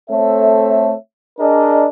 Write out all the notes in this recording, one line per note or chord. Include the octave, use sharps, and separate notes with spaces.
A3 C4 A4 C#5 E5
D4 G#4 A#4 D5 D#5